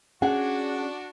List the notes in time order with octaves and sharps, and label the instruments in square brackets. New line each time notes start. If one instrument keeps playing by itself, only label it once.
[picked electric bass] C#4 [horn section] D4 F#4 [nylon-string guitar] G#4 [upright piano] F#5